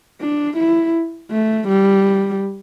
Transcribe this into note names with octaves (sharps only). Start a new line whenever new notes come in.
D4
E4
A3
G3